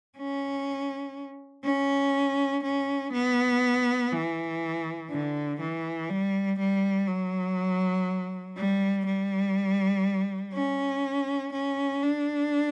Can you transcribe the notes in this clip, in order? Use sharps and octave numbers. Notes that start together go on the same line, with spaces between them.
C#4
C#4
C#4
B3
E3
D3
E3
G3
G3
F#3
G3
G3
C#4
C#4
D4